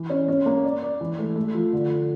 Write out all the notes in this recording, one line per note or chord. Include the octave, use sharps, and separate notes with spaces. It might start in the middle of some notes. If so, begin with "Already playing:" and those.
Already playing: E3
C#4
C#4
A#3
D5
D5
E3
A3
A3
F3
D3